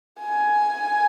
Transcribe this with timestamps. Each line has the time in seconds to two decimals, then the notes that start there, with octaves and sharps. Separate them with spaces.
0.20 G#5